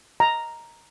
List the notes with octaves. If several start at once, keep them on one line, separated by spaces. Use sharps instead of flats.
A#5